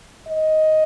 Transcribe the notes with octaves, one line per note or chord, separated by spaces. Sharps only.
D#5